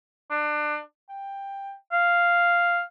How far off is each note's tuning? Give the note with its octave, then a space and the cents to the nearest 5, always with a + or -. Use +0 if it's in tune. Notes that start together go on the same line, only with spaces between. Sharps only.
D4 +25
G5 +10
F5 -5